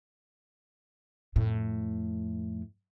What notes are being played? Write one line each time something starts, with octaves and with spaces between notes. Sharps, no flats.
F2 A2